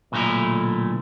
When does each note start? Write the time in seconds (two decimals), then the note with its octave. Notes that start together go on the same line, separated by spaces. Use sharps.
0.12 B1 A#2 D3 A3 E4 A#5